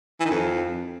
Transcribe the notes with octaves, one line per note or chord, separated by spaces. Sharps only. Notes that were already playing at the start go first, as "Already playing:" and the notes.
E3
D#3
F2